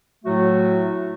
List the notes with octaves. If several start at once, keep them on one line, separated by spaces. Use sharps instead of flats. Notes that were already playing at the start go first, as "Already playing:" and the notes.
A2 F#3 A3 F#4